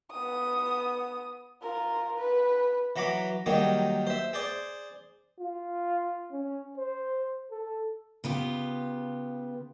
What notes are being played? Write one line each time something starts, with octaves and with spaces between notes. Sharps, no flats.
B3 D#6
F4 A#4
B4
E3 F#3 A#5 B5 D6
D#3 F#3 G3 A#3 G#4
C5 E5
G#4 C5 D5
F4
C#4
C5
A4
C#3 B3 F4 G4